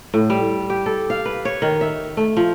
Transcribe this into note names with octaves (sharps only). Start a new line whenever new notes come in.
A2
G3
G4
A4
F5
B4
C#5
D#3
E5
A3
F3